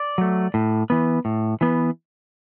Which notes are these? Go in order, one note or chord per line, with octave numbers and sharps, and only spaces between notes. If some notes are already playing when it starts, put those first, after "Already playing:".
Already playing: D5
F#3 A3
A2
E3 B3
A2
E3 B3